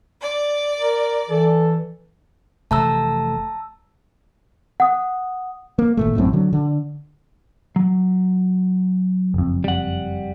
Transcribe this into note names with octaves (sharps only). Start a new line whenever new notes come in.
D5
A#4
E3 A4
F1 C3 E3 A3 A5 A#5 E6
F#5 D#6
A#3
G#1 A#2 A3
A#1 F#2 A2 C4
D3 F#3
D3
F#3
F#1 F2
G3 F#5